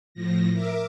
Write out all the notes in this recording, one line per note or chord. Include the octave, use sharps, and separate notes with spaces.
A2 F3 A#6
A#4 E5 D6